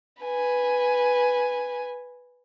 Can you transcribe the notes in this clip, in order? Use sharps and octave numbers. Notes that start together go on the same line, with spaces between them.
B4 G#5